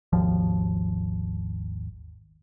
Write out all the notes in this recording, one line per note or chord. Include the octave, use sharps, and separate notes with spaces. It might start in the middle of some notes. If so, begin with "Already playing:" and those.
G#1 D#2 F3